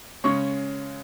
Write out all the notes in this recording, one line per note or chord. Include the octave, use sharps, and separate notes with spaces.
C#3 G#3 C#4 C#6